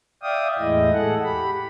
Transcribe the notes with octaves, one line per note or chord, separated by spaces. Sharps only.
D5 E5 F5 G5 D#6
E2 A2 G#3 E4 D#5
A2 G#4 A4 F#5
G4 B5